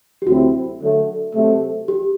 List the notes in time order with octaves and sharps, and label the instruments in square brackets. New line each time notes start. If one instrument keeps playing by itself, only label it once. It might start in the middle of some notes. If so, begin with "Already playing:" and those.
[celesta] G4
[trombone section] D2 C3 F#3 C4 E4 [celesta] F#4
[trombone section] D3 F#3 A3
C3 F#3 A3
[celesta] G4